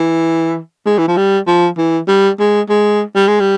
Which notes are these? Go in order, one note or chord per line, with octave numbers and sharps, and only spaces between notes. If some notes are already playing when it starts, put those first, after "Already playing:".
Already playing: E3
G#3
E3
F3
G3
F3
E3
G3
G#3
G#3
G3
G#3
G3